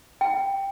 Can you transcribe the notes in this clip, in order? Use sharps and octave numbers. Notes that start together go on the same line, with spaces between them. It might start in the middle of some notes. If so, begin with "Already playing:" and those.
G5